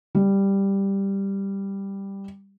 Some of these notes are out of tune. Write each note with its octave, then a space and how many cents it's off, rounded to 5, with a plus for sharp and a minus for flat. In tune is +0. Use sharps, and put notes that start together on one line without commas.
G3 +5